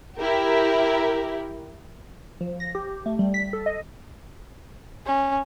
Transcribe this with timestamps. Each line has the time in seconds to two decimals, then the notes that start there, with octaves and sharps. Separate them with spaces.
0.18 E4 G4 A#4
2.41 F3
2.60 A#6
2.75 G4
3.06 A3
3.19 G3
3.34 B6
3.53 A4
3.66 D#5
5.06 C#4